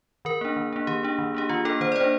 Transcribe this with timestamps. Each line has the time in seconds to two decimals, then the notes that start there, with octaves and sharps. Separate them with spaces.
0.25 D#3 A#4
0.41 A#3 D4
0.56 D#3
0.73 A#3 D4
0.87 D#3 G4
1.03 A#3 D4
1.19 D#3
1.34 A#3 D4 G4
1.49 D#3 F4
1.65 A#3 D4 A4
1.81 D#3 C5
1.92 D5
1.96 A#3 D4 C5